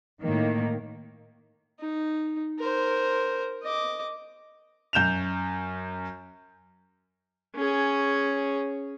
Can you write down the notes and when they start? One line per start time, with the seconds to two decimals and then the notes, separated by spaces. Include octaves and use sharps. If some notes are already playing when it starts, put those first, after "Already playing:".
0.22 A2 D#3 A#3
1.80 D#4
2.59 A#4 C5
3.63 D#5 D6
4.93 F#2 G6 E7 F7
7.56 C#4 G#4